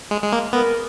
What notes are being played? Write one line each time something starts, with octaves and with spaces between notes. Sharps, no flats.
G#3
G#3
A#3
B3 A#4